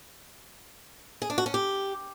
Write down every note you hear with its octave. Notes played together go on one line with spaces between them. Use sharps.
G#4
D4
F#4
C#4
G4